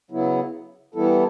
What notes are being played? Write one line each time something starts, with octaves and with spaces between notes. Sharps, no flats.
C#3 F#3 B3 E4
E3 G3 B3 E4 A4